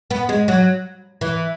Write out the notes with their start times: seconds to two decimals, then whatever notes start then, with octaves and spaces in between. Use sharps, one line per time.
0.11 B3
0.29 G#3
0.48 F#3
1.21 E3